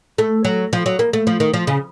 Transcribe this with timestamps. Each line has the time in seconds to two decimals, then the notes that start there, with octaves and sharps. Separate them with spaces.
0.18 A3
0.45 F#3
0.73 F3
0.86 F#3
0.99 A#3
1.13 A3
1.27 F3
1.40 D#3
1.54 F3
1.67 C#3